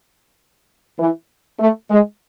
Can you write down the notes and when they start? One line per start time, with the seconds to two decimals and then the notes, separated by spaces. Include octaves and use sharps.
0.99 E3
1.60 A3
1.90 G#3